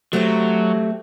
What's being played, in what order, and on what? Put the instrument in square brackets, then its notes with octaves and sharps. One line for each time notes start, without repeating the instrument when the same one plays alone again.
[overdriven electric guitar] F#3 [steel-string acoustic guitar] A3 C4 G4